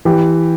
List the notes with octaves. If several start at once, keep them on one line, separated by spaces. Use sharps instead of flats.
E3 G4